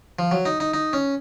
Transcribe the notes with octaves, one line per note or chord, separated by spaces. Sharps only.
F3
F#3
D#4
D#4
D#4
C#4